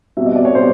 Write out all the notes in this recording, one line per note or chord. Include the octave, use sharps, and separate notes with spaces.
B2 G3 C4 E5
D#5
D5
C#5
G3 C4 C5